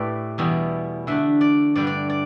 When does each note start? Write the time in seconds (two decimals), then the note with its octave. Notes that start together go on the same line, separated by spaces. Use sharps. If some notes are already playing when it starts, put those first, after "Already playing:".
Already playing: A2 A3 E4 G4 B4 D5
0.38 E2 B2 G3 E4
1.07 D3 A3 D4 E5
1.41 D5
1.75 G2 D3 G3 D5
1.87 D5
2.10 D5